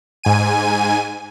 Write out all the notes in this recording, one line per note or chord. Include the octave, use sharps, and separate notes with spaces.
G#2 G#5 D#7